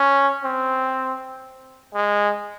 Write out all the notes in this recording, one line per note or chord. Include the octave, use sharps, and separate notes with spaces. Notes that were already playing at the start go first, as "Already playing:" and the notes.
Already playing: C#4
C4
G#3